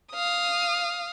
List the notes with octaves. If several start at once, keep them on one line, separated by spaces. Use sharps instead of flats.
F5 D#6